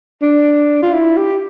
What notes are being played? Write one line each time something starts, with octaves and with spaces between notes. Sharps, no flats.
D4
F4
E4
G4